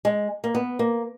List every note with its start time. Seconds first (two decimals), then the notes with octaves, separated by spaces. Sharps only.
0.05 G#3
0.44 A#3
0.55 B3
0.79 A#3